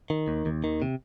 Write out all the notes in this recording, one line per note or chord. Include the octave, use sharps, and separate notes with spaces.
D#3
D#2
D#2
D#3
C3